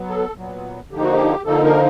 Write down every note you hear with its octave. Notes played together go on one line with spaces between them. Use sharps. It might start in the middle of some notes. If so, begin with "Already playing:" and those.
Already playing: F#3 B3
A4
A#2 F#3 B3
D3 F3 A#3 D#4 G4
F#4
G4
D3 F3 A#3 D#4 A4
A#4